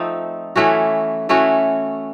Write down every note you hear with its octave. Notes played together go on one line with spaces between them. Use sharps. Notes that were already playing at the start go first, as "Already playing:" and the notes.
Already playing: F3 A3 C4 D#4
E3 A3 C#4 F#4
E3 A3 C#4 F#4